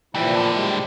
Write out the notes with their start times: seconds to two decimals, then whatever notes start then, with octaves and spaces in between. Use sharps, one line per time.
0.15 A#2 E3 F3 G3 E4
0.35 A2 D3
0.54 G3 G#3